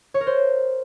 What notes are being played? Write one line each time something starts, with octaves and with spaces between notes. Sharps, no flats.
C#5
A#4
C5